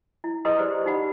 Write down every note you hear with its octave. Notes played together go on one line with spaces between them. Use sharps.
E4
G#4 B4 D#5 A#5 C6 D#6
G4 G#4 C5 D5
D#4 G4 F#5 B5